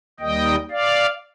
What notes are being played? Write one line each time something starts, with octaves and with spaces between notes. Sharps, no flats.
D#2 D#3 G3 D#5 G5
D5 F5